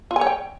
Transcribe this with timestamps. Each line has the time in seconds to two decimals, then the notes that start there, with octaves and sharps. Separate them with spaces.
0.11 F4
0.16 G#5
0.21 C#5
0.27 G5